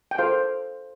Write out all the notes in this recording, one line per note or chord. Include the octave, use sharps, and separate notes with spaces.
G5
F4 A4 C5 F5